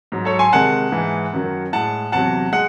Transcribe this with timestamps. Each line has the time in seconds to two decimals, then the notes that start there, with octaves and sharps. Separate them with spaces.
0.12 G#2 F#3
0.25 A4 C#5
0.39 G#5 C6
0.52 C3 D#3 G#3 F#5 A5
0.92 G#2 E3 G#3
1.33 F#2 D#3 F#3
1.73 A2 G#3 F#5 A5
2.12 E2 C3 F#3 F#5 A5
2.52 G#3 F#5